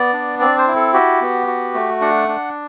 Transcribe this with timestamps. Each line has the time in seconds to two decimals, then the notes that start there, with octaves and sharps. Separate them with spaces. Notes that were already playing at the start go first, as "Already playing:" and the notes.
Already playing: B3 D5
0.13 D4
0.40 C4 D5
0.58 C5
0.67 E4
0.76 A4
0.93 F#4 G4
1.21 B3
1.47 F#4
1.74 A3
2.01 D4 F#5
2.28 D4